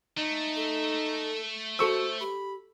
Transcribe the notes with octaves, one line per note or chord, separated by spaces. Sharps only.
A3 D#4
A4
F#4 A4 C5 C#6 E6
G4 B5